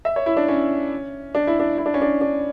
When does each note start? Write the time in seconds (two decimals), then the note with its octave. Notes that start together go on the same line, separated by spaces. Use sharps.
0.05 E5
0.16 C#5
0.26 E4
0.37 D4
0.48 C#4
1.35 D4
1.47 E4
1.60 D4
1.78 E4
1.86 D4
1.94 C#4
2.02 D4
2.21 D4